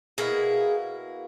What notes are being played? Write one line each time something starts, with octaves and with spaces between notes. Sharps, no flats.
B2 A#3 E4 G#4